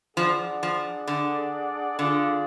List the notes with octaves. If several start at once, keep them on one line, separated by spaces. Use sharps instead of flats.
F3 D4 G#4 D5 F#5
F3
D3
D3 F4 G#4 D5 F5